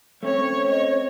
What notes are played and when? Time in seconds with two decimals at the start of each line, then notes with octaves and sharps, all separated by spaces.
0.23 A3 C4 C#4 C#5
0.70 C#5 D#5